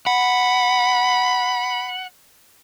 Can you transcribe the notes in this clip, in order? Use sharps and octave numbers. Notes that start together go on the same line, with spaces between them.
F#5 B5